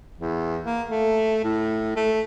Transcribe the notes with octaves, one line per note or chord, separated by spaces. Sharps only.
E2
A#3
A3
A2
A3